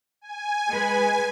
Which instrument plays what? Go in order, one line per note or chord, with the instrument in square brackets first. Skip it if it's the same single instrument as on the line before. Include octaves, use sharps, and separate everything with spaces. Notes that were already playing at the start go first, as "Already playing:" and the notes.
[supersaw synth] G#5
[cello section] G#3 B4